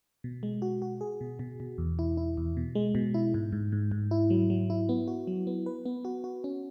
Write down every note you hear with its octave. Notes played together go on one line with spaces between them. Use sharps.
B2
G#3
F#4
F#4
G#4
B2
B2
B2
E2
E4
E4
E2
B2
G#3
B2
E4
G#2
G#2
G#2
G#2
E4
F#3
F#3
E4
B3
F#4
F#3
B3
B4
B3
F#4
F#4
C#4